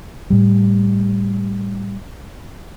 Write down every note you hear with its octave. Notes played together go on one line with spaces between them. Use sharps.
A2 G3